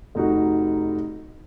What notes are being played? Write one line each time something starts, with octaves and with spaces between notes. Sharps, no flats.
F1 D#4 F#4